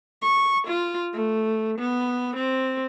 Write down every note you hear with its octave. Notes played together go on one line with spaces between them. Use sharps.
C#6
F4
A3
B3
C4